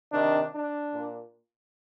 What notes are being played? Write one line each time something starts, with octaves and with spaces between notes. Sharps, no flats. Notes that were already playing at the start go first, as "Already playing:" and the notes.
C3 D#3 D4
D4
A#2